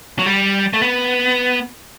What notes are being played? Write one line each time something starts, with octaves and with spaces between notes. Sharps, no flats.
F#3
G3
A3
B3